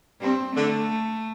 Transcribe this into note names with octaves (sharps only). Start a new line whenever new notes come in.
G2 G3 C4
D3 A3